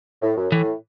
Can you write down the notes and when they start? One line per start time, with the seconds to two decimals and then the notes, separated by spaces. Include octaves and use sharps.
0.22 A2
0.37 F#2
0.52 A2 E3